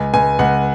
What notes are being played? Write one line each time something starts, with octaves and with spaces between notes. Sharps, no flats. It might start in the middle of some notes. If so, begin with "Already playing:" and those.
Already playing: C#2 G#5
C#2 G#5
C#2 F#5